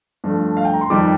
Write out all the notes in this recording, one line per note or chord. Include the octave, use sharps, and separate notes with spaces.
G2 F3 A3
F5
G5
A#5
C6
F2 D#3 G3 D6